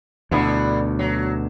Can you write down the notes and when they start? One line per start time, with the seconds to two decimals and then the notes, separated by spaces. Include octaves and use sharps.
0.31 D2 B2 D3 B3 E4
0.99 F#3